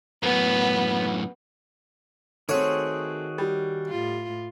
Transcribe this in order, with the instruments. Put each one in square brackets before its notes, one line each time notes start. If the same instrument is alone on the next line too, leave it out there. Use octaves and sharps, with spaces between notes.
[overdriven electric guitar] F#2 A2 [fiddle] B3
[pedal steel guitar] D#3 F#4 G#4 [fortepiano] A3 C4 [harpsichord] C#5
[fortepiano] G3
[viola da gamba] A2 F4